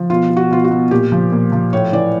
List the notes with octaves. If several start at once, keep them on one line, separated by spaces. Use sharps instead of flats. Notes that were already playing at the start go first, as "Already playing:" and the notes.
Already playing: F3
B2 F4
B2
F#4
B2 F4
F#4
B2
A#2 G4
F3
A#2
F3
A2 C#5
E3 D5